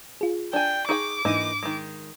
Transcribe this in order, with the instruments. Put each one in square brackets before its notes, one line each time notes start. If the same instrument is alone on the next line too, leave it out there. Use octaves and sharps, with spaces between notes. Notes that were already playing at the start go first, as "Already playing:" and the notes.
[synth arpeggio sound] F4 G#4
[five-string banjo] D4 G#5 [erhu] G5
[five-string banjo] D#4 G#4 G5 [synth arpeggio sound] C#6 [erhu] D6
[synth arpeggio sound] G#2 D4 D#7 [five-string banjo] E3 A#3 D#4
[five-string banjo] D#3 G#3